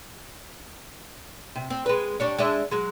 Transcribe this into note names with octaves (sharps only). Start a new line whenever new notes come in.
C3
C4
G#3 B4
G3 D4 C#5
G#3 D4 E5
F#3 G#3